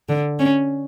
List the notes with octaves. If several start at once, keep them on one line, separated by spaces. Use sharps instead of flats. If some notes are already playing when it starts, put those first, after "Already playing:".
D3
C#4